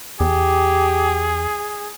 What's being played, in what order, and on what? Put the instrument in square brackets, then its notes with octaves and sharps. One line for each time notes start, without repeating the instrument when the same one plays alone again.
[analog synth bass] E2 [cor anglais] G4 [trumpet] G#4